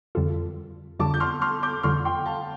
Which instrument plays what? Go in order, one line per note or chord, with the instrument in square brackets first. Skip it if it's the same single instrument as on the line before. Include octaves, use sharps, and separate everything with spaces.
[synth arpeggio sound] F2 D3 G3 F4 A4
[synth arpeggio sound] F2 D3 G3 F4 A4 [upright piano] A5 D6
[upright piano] G6
C6 F6
C6 F6
D6 G6
[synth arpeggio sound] F2 D3 G3 F4 [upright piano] C6 F6
[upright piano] G5 C6
F5 A5